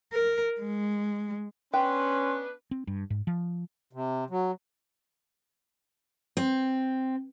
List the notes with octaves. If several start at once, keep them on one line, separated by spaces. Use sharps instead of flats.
A#4
G#3
B3 C#4 D4 B4 G5 C6
C4
G2
G#2
F3
C3
F#3
C4